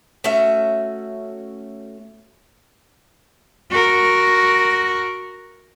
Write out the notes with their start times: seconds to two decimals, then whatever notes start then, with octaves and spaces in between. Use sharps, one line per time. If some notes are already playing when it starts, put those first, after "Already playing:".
0.24 A3 C#4 F#4 E5
3.71 F#4 A#4